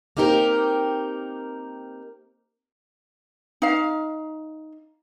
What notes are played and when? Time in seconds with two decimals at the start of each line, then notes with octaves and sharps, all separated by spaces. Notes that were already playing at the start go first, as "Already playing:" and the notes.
0.17 A#3 C4 D#4 G4 A#4
3.62 D#4 F5